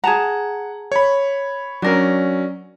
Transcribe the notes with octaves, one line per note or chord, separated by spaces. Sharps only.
G#4 F#5 A5 A#5
C#5 B5
F#3 C#4 D4 A#4